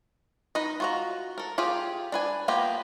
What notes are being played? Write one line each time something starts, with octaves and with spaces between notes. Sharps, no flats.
D#4 B4 D#5
F4 F#4 A#5
A4 A#4
F4 G4 G#4 F5
D4 B4 G#5
A#3 B3 F4 G4 G5